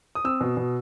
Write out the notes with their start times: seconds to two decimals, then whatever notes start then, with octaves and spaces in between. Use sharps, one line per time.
0.15 D#6
0.24 C4 E6
0.41 B2
0.57 B2